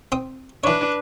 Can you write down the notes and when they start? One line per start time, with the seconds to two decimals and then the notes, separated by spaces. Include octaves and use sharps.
0.12 C4 G5 D#6
0.64 E3 D4 B4 C#5